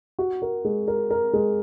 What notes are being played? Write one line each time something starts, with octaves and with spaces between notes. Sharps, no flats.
F#4
A#4
G#3
A#4
A#4
G#3